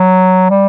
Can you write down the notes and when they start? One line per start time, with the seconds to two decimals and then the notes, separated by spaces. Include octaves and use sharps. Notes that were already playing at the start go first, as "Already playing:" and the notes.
Already playing: F#3
0.50 G3